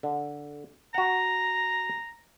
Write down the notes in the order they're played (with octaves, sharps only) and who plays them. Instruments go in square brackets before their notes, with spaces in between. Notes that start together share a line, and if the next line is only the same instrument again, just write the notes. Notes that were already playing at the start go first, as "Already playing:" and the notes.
[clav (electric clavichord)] D3
[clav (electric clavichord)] F#4 F#5 [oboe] A#5